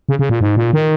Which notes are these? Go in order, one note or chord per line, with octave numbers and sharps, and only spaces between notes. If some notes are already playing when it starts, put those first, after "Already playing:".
C#3
C#3
A#2
G#2
A#2
D#3